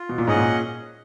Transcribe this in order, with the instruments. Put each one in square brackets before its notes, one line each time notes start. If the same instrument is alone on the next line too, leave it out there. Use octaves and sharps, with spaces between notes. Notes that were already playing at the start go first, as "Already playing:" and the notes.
Already playing: [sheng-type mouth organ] F4
[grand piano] B2
A#2
[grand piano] G#2 [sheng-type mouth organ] C#4 G#4 D#5 F#5
[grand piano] A#2